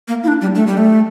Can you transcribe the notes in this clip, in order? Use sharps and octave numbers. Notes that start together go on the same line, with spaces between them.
A#3
E4
D4
G3
A3
G3
A3